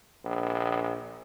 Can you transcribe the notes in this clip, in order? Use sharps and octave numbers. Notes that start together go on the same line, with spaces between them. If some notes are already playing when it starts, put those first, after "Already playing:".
A#1